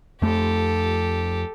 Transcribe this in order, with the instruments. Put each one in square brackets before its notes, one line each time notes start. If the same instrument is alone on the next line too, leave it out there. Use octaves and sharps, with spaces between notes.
[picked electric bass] F2 A3 [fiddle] G4 A4